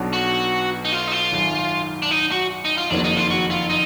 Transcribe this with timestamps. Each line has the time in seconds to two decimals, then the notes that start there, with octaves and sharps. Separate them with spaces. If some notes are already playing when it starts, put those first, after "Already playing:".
Already playing: B1 B2 F#3 D4
0.13 F#4
0.85 D#4
0.92 F4
1.08 D#4
1.12 F4
1.32 G#1 F#2 D#3
2.02 D4
2.11 D#4
2.32 F#4
2.65 D#4
2.78 F4
2.90 F#1 F2 D#3 F#3 A#3 D4
3.04 D#4
3.17 F4
3.30 F#4
3.51 F4
3.70 D#4